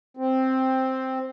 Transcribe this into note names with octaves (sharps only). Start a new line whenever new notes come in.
C4